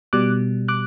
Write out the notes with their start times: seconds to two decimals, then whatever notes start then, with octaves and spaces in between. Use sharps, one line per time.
0.13 B2 G3 D6 F#6
0.68 D6 F#6